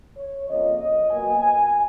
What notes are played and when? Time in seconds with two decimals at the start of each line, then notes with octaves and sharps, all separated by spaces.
0.17 C#5
0.48 F2 C#3 F3 A#3 D#5
0.79 D#5
1.09 B2 F#3 A#3 G#5
1.39 G#5